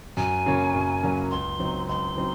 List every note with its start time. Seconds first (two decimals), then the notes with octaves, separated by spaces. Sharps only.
0.17 F#2 G#5
0.46 C#3 F#3 A#3 C#4
0.74 F#2
1.03 C#3 F#3 A#3 C#4
1.31 C#2 C6
1.59 C#3 F#3 C4 D#4
1.89 C#2 C6
2.17 C#3 F#3 C4 D#4